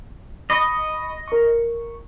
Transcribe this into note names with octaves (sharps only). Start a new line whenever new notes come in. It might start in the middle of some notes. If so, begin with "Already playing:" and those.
D#5 B5 C#6 D#6
A#4 C#6